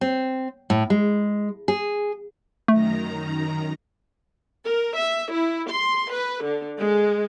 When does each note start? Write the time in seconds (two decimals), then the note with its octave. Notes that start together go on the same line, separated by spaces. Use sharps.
0.01 C4
0.70 A2
0.90 G#3
1.68 G#4
2.68 F#2 D#3 A3 A#5
4.65 A#4
4.97 E5
5.32 E4
5.70 C6
6.12 B4
6.44 D3
6.79 G#3